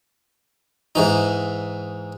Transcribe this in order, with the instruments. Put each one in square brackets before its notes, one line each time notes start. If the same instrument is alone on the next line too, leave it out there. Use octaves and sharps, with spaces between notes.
[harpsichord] G#2 E3 D#4